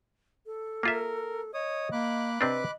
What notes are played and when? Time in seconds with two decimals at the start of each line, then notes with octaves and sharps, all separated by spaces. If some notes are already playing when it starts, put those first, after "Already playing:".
0.46 A4
0.83 A#3 F4 A#4 E5
1.54 C#5 D#5 D#6
1.92 A#3 B5 D6 F#6
2.41 C3 C4 D4 B4 D#5